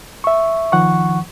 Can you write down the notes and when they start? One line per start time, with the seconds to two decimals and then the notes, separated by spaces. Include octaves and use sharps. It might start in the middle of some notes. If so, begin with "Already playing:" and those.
0.24 E5 C#6
0.72 D#3 F3 F#5 C#6